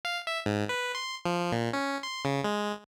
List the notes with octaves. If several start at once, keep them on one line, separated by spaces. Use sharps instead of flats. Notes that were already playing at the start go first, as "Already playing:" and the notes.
F5
E5
G#2
B4
C6
F3
A#2
C#4
C6
C#3
G#3